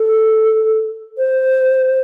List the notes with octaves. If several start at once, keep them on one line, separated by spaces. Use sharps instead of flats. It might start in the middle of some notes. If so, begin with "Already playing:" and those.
Already playing: A4
C5